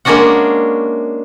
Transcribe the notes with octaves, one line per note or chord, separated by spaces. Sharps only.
G#3 A#3 C#4 D4 F#4 F#5